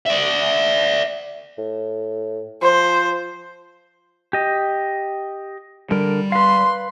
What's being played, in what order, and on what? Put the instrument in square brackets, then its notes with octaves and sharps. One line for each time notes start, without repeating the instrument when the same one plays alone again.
[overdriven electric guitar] D5 E5
[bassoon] A2
[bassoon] F3 [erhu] C5
[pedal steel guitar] G4 D#5
[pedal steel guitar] D3 A#4 [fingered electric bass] G3
[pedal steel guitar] B4 F5 [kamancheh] C6